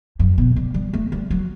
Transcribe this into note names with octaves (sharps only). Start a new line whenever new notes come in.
F#2
B2
G3
G3
A3
G3
F#3